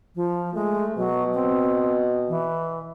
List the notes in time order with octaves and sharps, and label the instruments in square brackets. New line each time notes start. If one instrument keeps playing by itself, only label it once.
[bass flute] F3
[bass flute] G#3 [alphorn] A3
[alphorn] B2 [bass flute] F#3
[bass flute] C4
E3